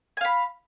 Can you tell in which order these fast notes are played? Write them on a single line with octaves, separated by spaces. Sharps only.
G#5 F5 B5